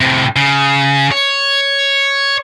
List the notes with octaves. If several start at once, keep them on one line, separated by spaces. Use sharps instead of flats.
A2 C3
C#3
C#5